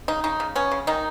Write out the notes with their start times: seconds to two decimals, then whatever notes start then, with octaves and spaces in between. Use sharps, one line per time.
0.08 C#3 D#4
0.24 C#3 D#4
0.40 C#3
0.55 B3 C#4
0.71 C#3
0.87 D#3 D#4